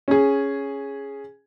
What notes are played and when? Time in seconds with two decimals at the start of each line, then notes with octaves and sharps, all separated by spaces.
0.08 C#4 G#4